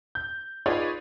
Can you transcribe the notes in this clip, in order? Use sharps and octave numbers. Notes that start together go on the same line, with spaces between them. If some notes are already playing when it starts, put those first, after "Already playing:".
G6
D#4 F4 G#4 B4 C#5 D5